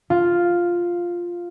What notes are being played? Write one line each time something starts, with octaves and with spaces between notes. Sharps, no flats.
F4